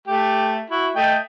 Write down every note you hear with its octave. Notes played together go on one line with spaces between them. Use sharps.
A3 G4
E4 F#4
A3 D#5 G5